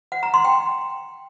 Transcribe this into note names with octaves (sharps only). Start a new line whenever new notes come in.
F#5
A#5
C6
G5